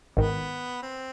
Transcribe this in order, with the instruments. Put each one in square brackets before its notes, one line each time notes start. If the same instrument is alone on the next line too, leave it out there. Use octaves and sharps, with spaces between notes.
[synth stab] G#1 G#2 D#3 [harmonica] B3
[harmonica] C4